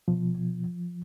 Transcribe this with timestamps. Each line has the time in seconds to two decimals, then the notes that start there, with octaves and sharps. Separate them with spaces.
0.08 B2 F3
0.38 B2